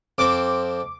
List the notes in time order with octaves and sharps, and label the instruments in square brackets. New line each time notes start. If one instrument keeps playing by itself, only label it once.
[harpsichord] F2 C4 [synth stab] D6